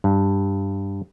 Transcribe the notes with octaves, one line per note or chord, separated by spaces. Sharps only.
G2